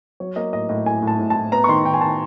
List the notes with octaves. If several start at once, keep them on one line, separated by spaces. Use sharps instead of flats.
F#3 C#5
A#3 D#5
A2 D#5
A2 D#5
A2 G#5
A2
A5
A2
A5
A2
B3 A#5
C#6
D#3 C6
D#3 G5
G#5
D#3 A5